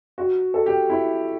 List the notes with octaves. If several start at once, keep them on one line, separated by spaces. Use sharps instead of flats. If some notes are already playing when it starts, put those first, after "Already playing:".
F#4
A4
G4
E4